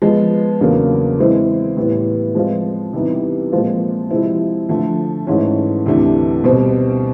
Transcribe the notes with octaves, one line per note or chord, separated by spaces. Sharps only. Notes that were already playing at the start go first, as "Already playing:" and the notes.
F3 G#3 B3
E2 C#3 F#3 A#3 D4
E3 G#3 C4 E4
A2 E3 G3 B3
F3 G#3 C4 F4
C3 E3 G3 B3 D#4
A#2 F3 G#3 C4 F4
C3 F3 G#3 C4 E4
D3 F3 A3
G#2 E3 A3 C#4
D2 C3 E3 A3 D4
B2 G3 C4